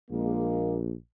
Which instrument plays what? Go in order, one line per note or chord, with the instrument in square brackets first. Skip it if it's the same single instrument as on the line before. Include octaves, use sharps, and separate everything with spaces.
[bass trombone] A#1 [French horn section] G#3 A#3